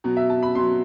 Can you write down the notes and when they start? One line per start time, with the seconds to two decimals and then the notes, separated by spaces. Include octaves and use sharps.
0.04 B2 F#3
0.17 E5
0.30 A5
0.43 B5
0.55 B2 F#3 C6